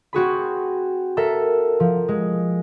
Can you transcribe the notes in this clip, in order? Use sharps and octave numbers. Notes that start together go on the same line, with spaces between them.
C4 F#4 G#4 B5
A4 A#4 E5
F3
G#3